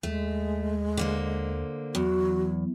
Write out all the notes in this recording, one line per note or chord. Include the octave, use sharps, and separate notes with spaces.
D#2 G#3 A3
D3 A#3 C5
E2 F#3 F#4